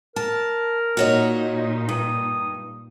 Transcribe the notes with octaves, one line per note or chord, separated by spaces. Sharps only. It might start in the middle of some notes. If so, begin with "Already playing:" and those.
A#4 A5
A#2 D#4 F#4 C#5 D#5
G2 D#6